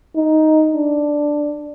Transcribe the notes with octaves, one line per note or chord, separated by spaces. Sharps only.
D#4
D4